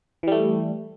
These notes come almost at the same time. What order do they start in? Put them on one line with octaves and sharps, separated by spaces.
E3 G3 A3